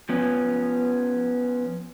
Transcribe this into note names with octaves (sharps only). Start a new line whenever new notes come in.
F3 B3 C#4